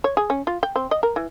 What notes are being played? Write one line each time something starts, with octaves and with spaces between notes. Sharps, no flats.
C#5
G#4
C#4
F4
G5
C4
D#5
A#4
E3